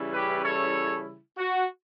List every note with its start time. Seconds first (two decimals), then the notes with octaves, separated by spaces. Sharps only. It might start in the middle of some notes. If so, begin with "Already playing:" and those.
Already playing: C#3 E3 G3 C#4 E4
0.14 G4 B4
0.44 A4 C#5
1.37 F#4